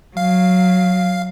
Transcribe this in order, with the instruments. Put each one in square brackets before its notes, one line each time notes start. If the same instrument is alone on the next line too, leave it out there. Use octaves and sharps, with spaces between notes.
[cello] F#3 [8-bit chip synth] F5